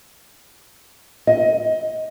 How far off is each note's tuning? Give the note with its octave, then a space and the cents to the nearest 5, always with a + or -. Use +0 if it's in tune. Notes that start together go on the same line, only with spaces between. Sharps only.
D#5 +20